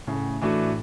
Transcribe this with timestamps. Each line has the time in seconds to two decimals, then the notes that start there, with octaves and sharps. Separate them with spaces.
0.07 A2 C#3
0.41 E3 A3 D4 F#4